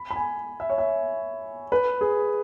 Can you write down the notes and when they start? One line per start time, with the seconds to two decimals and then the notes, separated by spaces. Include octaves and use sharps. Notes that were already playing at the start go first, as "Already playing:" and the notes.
Already playing: B5
0.11 B5
0.16 G#5
0.60 E5
0.70 C#5
0.78 E5
1.72 B4
2.01 G#4